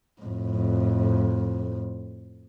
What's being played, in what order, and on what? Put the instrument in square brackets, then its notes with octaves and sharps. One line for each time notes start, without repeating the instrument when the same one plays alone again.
[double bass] F2 A2